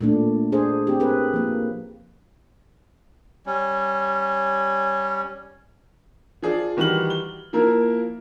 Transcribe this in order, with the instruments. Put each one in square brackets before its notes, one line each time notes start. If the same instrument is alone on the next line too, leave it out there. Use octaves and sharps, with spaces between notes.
[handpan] A#2 A3 D4
D4 G#4 C5
C4 G4
C4 G#4 A#4 B4
F3 A#3
[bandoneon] G3 C#4
[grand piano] F3 G#4 D5
D#3 E3 G3 F#4 F6 F#7
G7
F3 A#3 E4 A#4